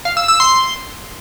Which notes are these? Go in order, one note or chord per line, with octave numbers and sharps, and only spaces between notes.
F5
E6
E6
C6